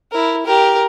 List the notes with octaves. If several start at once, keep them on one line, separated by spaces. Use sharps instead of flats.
E4 A#4
G4 A#4